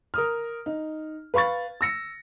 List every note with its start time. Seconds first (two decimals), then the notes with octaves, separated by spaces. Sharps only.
0.14 A#4 D#6 F6
0.66 D#4
1.34 B4 F5 B5 C#6 A6
1.81 E6 A#6 C#7